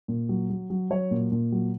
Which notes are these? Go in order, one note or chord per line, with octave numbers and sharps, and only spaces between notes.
A#2
F#3
F#3
F#3
F#3 C#5
A#2
A#2
F#3